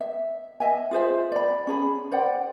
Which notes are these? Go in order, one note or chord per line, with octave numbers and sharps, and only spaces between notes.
E5
D#5 E5 G#5
F4 G#4 C5 E5
D5 B5
C#4 G#4 B5
C5 D5 F#5 G5